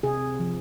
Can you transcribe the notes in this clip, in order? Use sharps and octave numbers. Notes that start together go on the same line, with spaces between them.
C3 G#4
F3